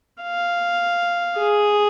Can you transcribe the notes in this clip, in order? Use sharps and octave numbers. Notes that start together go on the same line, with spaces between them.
F5
G#4